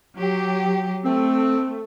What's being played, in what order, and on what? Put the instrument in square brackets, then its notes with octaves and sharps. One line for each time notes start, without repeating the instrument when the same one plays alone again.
[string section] F#3 G4
[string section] A3 [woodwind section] C4